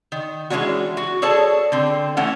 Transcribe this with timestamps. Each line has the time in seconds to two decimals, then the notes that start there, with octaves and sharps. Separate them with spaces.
0.12 D#3
0.50 E3 G#3 A#3 C#4 D4 F#4
0.97 F#4
1.22 G#4 A4 C#5 D5 A5
1.72 D3 C4
2.17 E3 A3 C#4 F#5